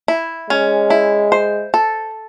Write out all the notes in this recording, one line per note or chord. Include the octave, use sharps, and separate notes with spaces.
E4
G#3 C#4
E4
C5
A4